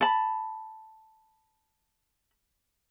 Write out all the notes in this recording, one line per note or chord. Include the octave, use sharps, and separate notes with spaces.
A5 B5